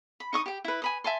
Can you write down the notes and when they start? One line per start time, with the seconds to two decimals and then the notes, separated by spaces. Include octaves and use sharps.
0.20 B5
0.33 D#4 C#6 D#6
0.46 G4 G5
0.64 E4 B4
0.82 G#5 B5 D#6
1.04 E5 G#5 A5 C6